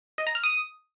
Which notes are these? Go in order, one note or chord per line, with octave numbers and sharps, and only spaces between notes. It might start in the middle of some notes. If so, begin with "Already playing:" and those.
D#5
A#5
F6
D#6